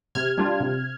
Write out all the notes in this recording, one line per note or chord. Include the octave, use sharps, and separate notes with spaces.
C3 F6 G#6
G3 D4 F4
C3